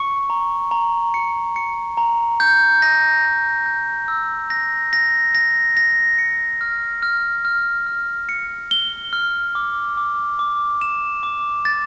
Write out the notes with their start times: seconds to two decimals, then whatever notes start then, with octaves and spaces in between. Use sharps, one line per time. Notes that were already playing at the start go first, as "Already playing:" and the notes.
Already playing: C#6 C#7
0.30 A#5
0.71 A#5
1.14 C#7
1.56 C#7
1.97 A#5
2.40 G6
2.82 A#6
3.25 A#6
3.66 G6
4.08 E6
4.50 A#6
4.93 A#6
5.35 A#6
5.77 A#6
6.19 C#7
6.61 F6
7.03 F6
7.45 F6
7.86 F6
8.29 C#7
8.71 G7
9.13 F6
9.55 D6
9.97 D6
10.39 D6
10.81 E7
11.23 D6
11.65 A6